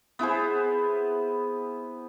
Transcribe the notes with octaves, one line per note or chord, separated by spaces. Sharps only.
B3 E4 G#4 C5